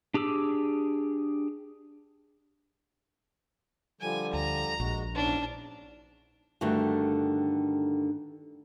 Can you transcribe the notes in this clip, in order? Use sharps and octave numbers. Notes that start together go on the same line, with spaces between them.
D4 G4 G#4 D6 E6
D3 F3 G3 G#5
D2 A#5
A#1 G#3 F#4
E2 G#2 C#4 D4
G2 D3 D#3 A3 F#4